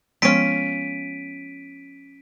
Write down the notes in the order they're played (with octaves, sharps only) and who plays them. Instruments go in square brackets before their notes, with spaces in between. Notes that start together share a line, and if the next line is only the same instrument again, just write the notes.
[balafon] F3 G#3 B3 [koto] C#4 F4 [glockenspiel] B6 D7 D#7